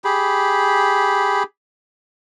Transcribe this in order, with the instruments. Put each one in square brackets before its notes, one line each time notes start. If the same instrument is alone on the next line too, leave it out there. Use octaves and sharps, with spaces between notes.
[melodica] G4 G#4 B5